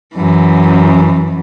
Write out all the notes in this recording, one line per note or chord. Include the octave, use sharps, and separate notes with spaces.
F#2 E3